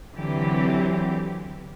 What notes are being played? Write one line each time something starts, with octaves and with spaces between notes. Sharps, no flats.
D3 E3 F#3 C4 G4